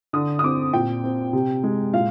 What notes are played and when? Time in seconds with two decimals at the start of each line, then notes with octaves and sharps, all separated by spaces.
0.13 D3 D#6
0.39 D#6
0.44 C4 D6
0.73 A#2 G5
1.04 C4
1.33 C3
1.63 G#3
1.93 A#2 F5